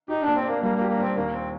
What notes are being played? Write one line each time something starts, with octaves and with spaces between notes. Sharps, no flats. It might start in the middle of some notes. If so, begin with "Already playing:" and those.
D#4 G4
A#2 D4
C4
A#3 D4
G3 A#3
A#3
G4
A#3
A#2 C4
D#2 A#3
C4